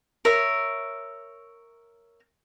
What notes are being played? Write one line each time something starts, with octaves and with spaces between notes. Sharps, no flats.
A#4 C#5 E5